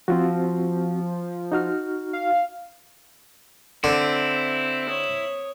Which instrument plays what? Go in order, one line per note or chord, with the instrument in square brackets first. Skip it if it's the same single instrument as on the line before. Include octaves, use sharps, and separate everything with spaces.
[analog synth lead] F3 [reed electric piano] C4 F4 F#4
[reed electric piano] D#4 F#4 F6
[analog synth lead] F5
[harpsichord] D3 [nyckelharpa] C4 [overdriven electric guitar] E4
[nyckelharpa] C#5 D#6